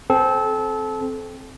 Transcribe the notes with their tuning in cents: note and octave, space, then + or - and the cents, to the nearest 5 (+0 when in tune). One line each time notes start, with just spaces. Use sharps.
C4 +0 A4 -25